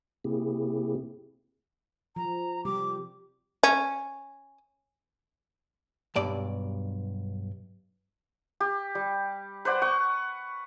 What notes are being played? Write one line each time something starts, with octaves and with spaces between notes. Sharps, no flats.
C3 A#3 C4 E4 G4 G#4
F3 A#5
C3 G3 G4 D6
C#4
B1 G2 D5
G4
G3
B4 C5 D5 F#5
F#5 C#6